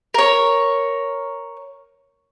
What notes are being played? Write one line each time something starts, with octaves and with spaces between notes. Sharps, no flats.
A#4 C#5